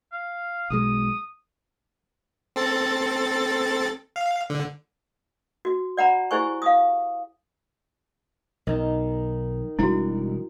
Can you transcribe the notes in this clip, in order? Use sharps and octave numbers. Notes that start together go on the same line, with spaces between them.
F5
B1 B2 G#3 D#6
C4 A4 A6
F5
D3
F#4
D5 F#5 A#5 B5
E4 G4 G#4 C5 G#5 C#6
F5 D#6
B1 D#3 D#4
E1 G3 D4 E4 F#4